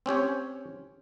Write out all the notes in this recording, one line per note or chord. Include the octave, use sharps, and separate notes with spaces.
C4 C#4 G4 C#5